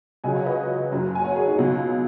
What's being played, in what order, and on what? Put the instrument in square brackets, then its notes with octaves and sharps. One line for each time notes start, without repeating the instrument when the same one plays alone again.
[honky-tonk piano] C#2 C#3 F#3 D#5 G#5
C#5 F#5
B4 D#5
F#1 F#2 F#3
G#5
C#5 F#5
G#4 C#5
D#4 G#4
C#2 B2 F#3